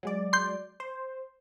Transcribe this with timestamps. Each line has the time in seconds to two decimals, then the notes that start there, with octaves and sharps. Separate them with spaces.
0.03 F#3 G#3 D5
0.33 C6 G6
0.80 C5